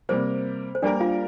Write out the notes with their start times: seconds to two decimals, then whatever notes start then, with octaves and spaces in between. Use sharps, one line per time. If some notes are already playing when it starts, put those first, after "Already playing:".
0.09 C3 G3 A#3 C5
0.75 C5
0.82 G3 A#3 D4 G4 A#4 D5
1.00 F4 F5